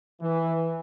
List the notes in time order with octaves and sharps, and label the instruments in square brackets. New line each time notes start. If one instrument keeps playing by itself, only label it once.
[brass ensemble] E3